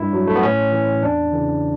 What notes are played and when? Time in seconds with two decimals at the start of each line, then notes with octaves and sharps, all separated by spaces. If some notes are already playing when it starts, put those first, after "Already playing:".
Already playing: G2 E4
0.13 F#3
0.27 A3
0.35 B3
0.43 A2 C#4
0.72 E3
1.03 E2 D4
1.33 C#3 E3